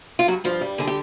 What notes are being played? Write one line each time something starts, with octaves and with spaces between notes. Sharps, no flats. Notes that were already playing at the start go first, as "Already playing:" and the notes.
F4
G2 F#3 F#4
G2 F3 F4
G3
D3 G#4
G4